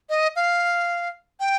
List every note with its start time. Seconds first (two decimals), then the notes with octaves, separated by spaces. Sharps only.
0.10 D#5
0.36 F5
1.40 G5